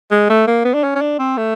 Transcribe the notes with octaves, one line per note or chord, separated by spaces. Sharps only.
G#3
A3
A#3
B3
D4
C#4
C#4
D4
C4
A3